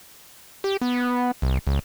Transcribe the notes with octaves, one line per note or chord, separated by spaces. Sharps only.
G4
B3
C2
C#2